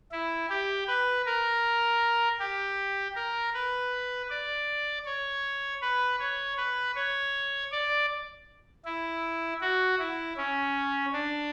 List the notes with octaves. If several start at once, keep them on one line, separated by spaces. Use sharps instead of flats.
E4
G4
B4
A#4
G4
A#4
B4
D5
C#5
B4
C#5
B4
C#5
D5
E4
F#4
E4
C#4
D4